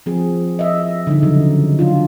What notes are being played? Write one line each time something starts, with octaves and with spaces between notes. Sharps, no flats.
F3 C4 G#4
D#5 E5
D3 G3 D#4
C#3 F3 F#3
F#3 D4 F4